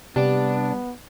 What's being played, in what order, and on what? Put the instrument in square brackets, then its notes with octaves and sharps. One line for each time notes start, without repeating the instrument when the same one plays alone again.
[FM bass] C3 [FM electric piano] G3 [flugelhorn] B3 [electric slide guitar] D4 D5